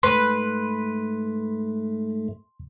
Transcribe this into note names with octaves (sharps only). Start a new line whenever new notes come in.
G#2 A3 B4 C6